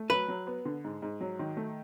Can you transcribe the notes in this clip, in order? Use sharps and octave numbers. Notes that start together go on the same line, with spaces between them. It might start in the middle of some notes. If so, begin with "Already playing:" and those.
Already playing: A3
F#3 B4
F#3
B3
D3
G#2
G#2
F#3
D#3
A3